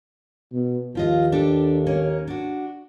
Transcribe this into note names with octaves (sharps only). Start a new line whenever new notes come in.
B2
D#2 F3 F4 D#5
D4 G4 A4
A#3 C#4
D4 F#4